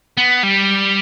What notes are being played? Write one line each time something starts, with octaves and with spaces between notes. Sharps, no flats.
B3
G3